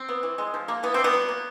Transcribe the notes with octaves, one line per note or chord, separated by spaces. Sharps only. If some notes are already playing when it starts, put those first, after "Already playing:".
Already playing: C4
B3
E3
G#3
F3
A#3
E3 B3
C4
G3
B3
F#3
A#3